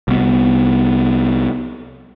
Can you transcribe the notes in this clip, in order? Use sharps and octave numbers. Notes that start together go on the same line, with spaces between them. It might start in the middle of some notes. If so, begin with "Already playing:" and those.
C2 B3